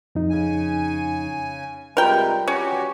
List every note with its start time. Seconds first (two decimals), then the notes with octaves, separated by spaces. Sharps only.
0.15 F2 D#4
0.30 C#3 G#5
1.97 C3 G3 G#3 F4 A#4 B4 G5
2.48 C#4 F#4 G4